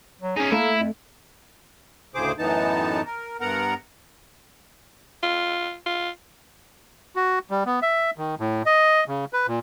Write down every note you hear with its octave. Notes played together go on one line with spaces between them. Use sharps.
F#3
C#4 D#4 G#4
A3 A#3 E4
F2
D2 A2 C#3 G#4 C5 D6
F#2 A2 E3 B3 D#4 A5
A#4
G2 B3 A#4 F#5 A#5
F4
F4
F#4
G3
B3
E5
D#3
A2
D#5
C#3
B4
A#2